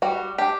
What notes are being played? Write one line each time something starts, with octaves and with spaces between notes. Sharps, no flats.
G3 F#4
D4 G4